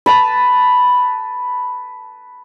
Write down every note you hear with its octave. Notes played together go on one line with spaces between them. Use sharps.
B4 A5 B5